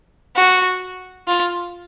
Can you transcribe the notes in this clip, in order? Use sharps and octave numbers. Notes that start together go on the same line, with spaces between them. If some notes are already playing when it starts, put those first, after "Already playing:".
F#4
F4